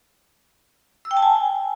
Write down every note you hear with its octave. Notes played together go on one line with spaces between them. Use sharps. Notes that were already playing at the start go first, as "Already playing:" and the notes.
E6
G5
A5
G#5